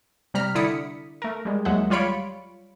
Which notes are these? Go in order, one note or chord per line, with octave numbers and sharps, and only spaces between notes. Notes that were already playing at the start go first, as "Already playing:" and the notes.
C3 G3 A#5 F6 B6
D3 E4 D5 D#6 B6 C#7
A3 A#4
G3 G#3
D#2 F#3 G#3 E5 F#5
G3 F4 C#5 B5 C#7 D7